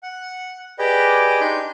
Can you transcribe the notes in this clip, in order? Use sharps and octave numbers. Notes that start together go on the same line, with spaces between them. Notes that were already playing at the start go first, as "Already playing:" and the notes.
F#5
G4 G#4 B4 D5 D#5 G5
D4 D#4 C6 G6